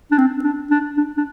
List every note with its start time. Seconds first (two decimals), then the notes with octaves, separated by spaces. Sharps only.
0.11 D4
0.18 C4
0.44 D4
0.70 D4
0.97 D4
1.17 D4